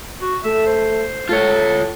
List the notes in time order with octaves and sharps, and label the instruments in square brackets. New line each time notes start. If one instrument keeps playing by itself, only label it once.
[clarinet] F#4
[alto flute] A3 [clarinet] E5
[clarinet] C5
[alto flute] A3 [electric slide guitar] F4 C#5 [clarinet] A5